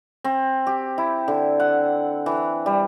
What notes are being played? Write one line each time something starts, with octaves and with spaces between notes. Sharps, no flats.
C4
G4
E4
D3
F#5
E3
G3